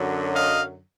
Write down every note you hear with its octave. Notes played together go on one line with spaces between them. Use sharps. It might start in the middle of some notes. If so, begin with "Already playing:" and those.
Already playing: F#2 D3 F#3
D#5 F5